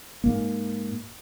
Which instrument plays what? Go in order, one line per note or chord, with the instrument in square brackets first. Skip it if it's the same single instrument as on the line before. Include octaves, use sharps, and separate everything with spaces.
[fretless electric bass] G#2 A#3